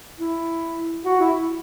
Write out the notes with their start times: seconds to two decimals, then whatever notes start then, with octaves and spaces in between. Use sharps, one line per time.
0.20 E4
1.05 F#4
1.20 E4